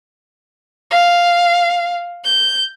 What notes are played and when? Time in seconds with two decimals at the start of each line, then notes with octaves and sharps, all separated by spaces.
0.91 F5
2.24 G6